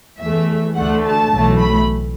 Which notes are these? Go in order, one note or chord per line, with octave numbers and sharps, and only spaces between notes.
E2 E3 A3 E5
D2 D3 A3 F#5
A5
B1 A2 E3 A3
B5